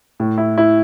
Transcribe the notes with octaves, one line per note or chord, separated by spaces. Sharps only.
A2
E4
E4